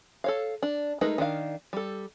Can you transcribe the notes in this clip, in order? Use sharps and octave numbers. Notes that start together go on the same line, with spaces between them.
A4 C#5 F5
D4
G#3 A3 D#4 A#4 B4
D#3 D4 F5
G3 A4